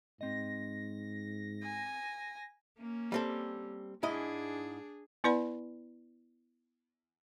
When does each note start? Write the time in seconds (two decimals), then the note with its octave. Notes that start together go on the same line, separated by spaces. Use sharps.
0.21 G#2 C4 D#5 A#6
1.63 G#5
2.78 A#3 C#4
3.12 G3 C4 A4
4.03 G#2 D4 E4 G#4 D#5
5.24 B3 E4 B4 D5 F#5 B5